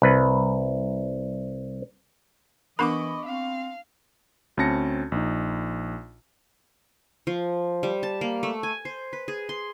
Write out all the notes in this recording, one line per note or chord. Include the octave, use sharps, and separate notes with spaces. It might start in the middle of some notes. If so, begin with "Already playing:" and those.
C2 B4
E3 B3 D4 A#4 D#5 B5 C#6 D6
C4 F5
D2 C4 C#4 A5 A#6 C#7
A#1 D#4
F3
G3
A5
A#3
A3
G#5
C5
B4
G#4
C6